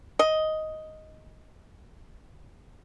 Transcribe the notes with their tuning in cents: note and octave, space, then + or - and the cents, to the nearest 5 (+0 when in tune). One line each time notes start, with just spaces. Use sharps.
D#5 +5